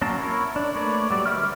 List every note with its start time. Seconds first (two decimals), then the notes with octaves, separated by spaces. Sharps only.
0.02 F#3 A#3 C#4 A#4 A5
0.18 E4 A#4 C#5
0.56 D4
0.76 A3 A#3 B4 C#5 D5
1.10 F#3 G3 D5
1.26 D3 B4 E5 C#6 F6